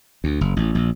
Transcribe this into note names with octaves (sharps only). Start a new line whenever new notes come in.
D2
F#1
A1
A#1